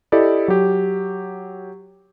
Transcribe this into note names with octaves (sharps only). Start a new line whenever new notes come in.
E4 G4 A4 D5 D#5
F#3 G4